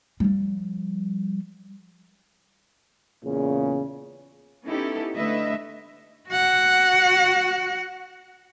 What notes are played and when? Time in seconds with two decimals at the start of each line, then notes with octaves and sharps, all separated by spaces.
0.20 F3 G3
3.23 E2 A#2 C#3
4.66 B3 C#4 D#4 E4 G4 A4
5.15 D3 A3 B4 D#5 E5
6.29 F#4 F#5